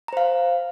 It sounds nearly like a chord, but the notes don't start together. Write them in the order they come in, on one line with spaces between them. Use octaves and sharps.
A#5 C5 F5